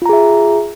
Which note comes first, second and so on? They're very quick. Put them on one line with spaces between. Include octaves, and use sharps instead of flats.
F4 A#5 G#4 E5